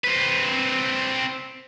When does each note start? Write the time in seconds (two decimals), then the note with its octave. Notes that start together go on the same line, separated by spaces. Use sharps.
0.04 C4 B4